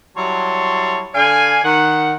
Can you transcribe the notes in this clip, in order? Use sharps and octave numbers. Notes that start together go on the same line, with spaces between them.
F#3 G3 E4 C#5 A5 C6
D3 D5 F5 G#5
D#3 F#5